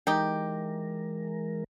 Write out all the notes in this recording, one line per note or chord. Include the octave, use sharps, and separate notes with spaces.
E3 G#3 D#4 G4 A#4